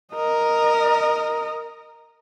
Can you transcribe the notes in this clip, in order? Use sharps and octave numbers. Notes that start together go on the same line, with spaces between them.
A#4 D#5